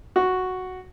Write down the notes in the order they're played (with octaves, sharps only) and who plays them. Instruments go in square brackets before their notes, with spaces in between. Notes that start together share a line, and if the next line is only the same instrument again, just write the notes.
[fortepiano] F#4